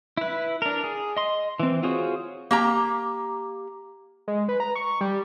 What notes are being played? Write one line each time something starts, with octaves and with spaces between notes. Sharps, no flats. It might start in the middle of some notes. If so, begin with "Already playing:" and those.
E4 B4
D4 A#4
G#4
D#5 C6
E3 C4
F4 F#4 G#4 C5 C#5
A#3 G4 A#5
G#3
B4
A#5
C#6
G3